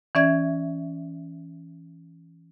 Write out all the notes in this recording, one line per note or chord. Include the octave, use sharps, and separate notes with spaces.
E3 C#4 D5 E5 G#6